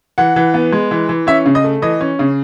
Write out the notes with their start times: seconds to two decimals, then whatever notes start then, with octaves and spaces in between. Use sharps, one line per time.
0.18 E3 F#5
0.36 E3
0.54 B3
0.72 G#3
0.91 E3
1.09 E3
1.27 C#4 E5
1.46 C#3
1.55 D#5
1.64 A3
1.82 E3 D#5
2.01 C#4
2.19 C#3